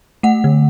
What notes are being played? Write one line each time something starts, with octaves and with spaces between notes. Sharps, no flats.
A3 F#5
D3